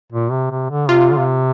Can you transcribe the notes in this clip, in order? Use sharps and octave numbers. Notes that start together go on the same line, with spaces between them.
A#2
C3
C3
D3
C3 F4
D3
C3